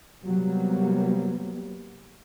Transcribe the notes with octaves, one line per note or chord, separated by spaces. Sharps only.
C3 F#3 G3 A#3 B3